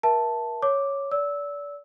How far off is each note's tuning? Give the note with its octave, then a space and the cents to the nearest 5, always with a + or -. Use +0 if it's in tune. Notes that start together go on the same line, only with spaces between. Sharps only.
A#4 +35 E5 +0 A5 +0
C#5 +0 D6 +0
D5 -30 E6 -15